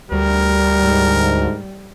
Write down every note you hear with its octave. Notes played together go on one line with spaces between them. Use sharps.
D2 G3 A#4
G#2